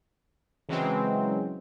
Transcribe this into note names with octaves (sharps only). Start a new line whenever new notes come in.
C#3 E3 F#3 G#3 C4